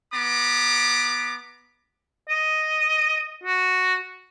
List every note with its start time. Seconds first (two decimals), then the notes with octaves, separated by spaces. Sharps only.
0.13 B3 A#5 D6
2.29 D#5
3.44 F#4